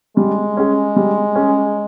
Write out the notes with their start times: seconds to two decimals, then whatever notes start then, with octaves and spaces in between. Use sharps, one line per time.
0.17 G3 G#3
0.57 C#4 G#4
0.96 G3
1.35 C#4 G#4